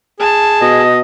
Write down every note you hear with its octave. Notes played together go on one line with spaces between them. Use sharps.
G#4 A5
B2 D#5